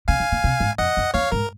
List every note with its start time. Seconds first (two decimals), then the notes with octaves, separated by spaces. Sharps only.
0.08 C#3 F5 G#5
0.20 D#3
0.32 D#3
0.44 C3
0.60 G#2
0.78 F2 D#5 F#5
0.97 F#2
1.14 F2 C#5 F5
1.32 G#2 A#4